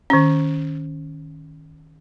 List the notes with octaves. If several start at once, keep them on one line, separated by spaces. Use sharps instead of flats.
D#3 C#4